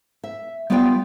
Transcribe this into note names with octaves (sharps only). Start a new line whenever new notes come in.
E5
G3 B3 F4 G4 D5 G5